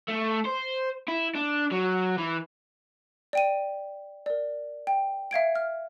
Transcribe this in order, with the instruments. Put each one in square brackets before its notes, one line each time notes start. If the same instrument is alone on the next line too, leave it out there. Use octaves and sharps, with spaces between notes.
[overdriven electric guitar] A3
C5
E4
D4
F#3
E3
[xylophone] D5 G5 D#7
A#4 D5
G5
E5 F5 G#6 D7
F6